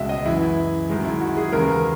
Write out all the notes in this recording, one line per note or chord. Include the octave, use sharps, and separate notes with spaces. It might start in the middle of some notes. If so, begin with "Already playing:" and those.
Already playing: C#2 B2 G#3 E5
D#5
F#2 E3 G#3 E4
F#2 D#3 G#3
E4
F#4
G#4
D#2 C#3 E3 G#3 A#4